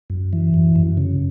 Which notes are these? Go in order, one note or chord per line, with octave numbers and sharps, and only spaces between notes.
F#2
E3
F#2
F#2
C#3